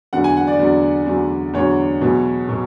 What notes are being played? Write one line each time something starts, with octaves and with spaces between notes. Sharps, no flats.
E2 D3 F#3 F#5
G#5
F#5
D5
E2 D3 F#3
E2 D3 F#3
E2 D3 F#3 C#5
E2 B2 F#3
B2 F#3